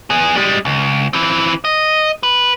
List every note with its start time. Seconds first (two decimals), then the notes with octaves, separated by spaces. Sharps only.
0.10 B3 G#4
0.35 G3 G#3
0.65 C#2
1.13 E3 C4
1.65 D#5
2.23 B4